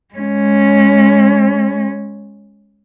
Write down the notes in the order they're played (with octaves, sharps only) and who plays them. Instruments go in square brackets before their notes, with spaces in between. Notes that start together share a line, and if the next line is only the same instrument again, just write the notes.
[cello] G#3 C#4